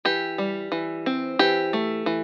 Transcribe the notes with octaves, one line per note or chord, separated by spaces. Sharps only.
E3 G4
G3
E3
C4
E3 G4
A3
E3